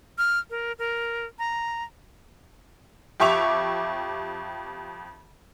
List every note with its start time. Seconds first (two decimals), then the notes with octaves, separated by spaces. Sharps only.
0.18 F6
0.50 A#4
0.79 A#4
1.39 A#5
3.20 F2 G4 E5 C#6 D6 F7